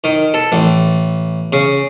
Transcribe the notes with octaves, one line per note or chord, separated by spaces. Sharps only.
D#3
A4
A1
C#3